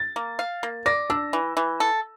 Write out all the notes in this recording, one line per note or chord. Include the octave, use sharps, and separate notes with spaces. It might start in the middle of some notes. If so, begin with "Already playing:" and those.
Already playing: A6
A#3
F5
A#3
D5 A#6
D4 E6
E3
E3
A4